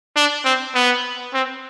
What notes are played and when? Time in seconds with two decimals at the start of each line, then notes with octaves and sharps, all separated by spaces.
0.16 D4
0.45 C4
0.75 B3
1.34 C4